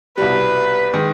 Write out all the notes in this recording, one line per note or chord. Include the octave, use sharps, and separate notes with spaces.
C2 B2 G3 B4
D#3 G#3